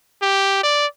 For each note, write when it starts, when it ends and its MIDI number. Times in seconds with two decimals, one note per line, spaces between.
0.22 0.61 67
0.63 0.86 74